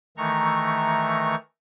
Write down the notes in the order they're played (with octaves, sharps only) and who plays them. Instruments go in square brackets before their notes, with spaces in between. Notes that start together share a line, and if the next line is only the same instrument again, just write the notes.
[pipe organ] D#3 E3 A3 A#5 C#6